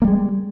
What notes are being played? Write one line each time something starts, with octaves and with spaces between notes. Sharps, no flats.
G3 G#3 A#3